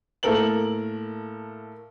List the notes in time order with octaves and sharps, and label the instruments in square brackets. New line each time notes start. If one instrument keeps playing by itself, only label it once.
[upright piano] A2 A#3 A4 A#4 F#7